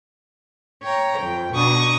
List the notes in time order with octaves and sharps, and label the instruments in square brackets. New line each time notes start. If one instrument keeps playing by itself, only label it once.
[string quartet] C#5 G5 A#5
F2 G5
[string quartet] B2 D4 D#4 [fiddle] C#6 D#6